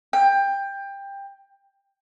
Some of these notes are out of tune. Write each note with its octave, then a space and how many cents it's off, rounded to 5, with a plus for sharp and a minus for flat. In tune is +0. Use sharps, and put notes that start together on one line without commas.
G5 +20